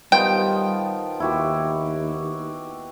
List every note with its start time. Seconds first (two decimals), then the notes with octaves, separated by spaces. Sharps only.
0.12 D#3 F3 G3 B3 G5
1.20 D#2 E4 F#4 G4